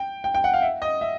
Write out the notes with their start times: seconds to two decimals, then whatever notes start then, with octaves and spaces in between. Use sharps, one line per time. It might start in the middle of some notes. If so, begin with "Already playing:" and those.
Already playing: G5
0.24 G5
0.34 G5
0.44 F#5
0.53 F5
0.62 E5
0.82 D#5
1.01 E5